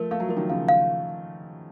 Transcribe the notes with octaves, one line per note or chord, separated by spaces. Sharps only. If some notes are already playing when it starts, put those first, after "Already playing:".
Already playing: F3 A3 A#4
A3 F5
F#3
F3 A#4
D#3 F#3
C#3 F3 F5
F5